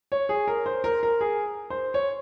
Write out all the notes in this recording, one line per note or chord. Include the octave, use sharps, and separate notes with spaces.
C#5
G#4
A#4
C5
A#4
A#4
G#4
C5
C#5